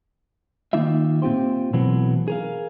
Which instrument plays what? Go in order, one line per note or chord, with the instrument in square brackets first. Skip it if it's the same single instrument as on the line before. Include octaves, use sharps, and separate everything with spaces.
[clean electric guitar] D#3 A#3 D#4 F4 E5
A#2 C4 F4 G4 C5
B2 E3 F#3 A3 B3 C4
G#4 A#4 F5